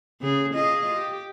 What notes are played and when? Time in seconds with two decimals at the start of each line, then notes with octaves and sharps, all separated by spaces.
0.21 C#3 G#4
0.54 F4 G#4 D#5
0.95 G4